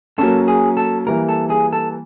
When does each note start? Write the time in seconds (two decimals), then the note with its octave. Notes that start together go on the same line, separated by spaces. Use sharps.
0.18 F#3 A#3 C#4 A4
0.48 G#4
0.77 A4
1.07 E3 G3 A#3 A#4
1.29 A4
1.50 G#4
1.73 A4